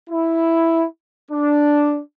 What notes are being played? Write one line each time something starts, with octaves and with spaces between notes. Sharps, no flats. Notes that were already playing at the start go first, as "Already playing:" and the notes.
E4
D4